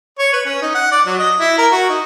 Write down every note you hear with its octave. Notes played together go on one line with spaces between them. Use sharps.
C#5
B4
C#4
D#4
F#5
D5
F#3
D#5
E4
A#4
F#4
D#4